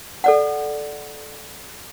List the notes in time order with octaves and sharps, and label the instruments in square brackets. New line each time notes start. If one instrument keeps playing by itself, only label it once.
[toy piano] A4 D5 F#5